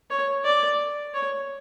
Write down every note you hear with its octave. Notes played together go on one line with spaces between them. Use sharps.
C#5
D5
C#5